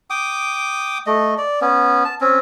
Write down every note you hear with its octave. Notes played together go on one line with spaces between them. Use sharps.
G5 D6 D#6
A3 D#5
D5
B3 C#4
A5
C4 C#4